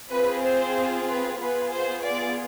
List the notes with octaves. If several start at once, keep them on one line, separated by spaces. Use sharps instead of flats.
C4 F4 G#4 B4
C5
B4
B3 F4 G#4 B4
C5
D5